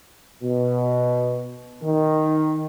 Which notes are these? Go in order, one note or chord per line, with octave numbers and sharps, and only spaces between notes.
B2
D#3